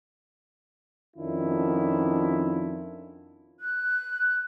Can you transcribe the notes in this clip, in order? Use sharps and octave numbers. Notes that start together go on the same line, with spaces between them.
F2 D#3 C#4 D4 E4 F4
F#6